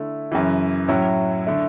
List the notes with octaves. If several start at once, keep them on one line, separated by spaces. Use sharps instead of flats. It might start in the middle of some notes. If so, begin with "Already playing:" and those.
Already playing: D3 A3 E4
F#2 C#3 E3
A2 F#3 C#4 E4
D3 A3 E4